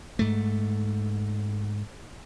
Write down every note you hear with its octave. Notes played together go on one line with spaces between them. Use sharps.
G#2 A3